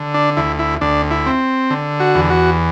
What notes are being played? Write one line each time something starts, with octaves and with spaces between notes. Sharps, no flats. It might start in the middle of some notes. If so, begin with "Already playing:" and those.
Already playing: D3
D4
D2 E4
E4
D2 D4
E4
C4
D3
F#4
E2
F#4